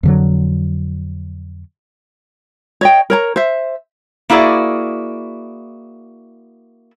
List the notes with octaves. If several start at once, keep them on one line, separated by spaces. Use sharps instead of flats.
F2 D3 F#3
C#5 D#5 G5
A#4 C#5 A#5
C5 E5
A#3 E4 F#4 G#4 D5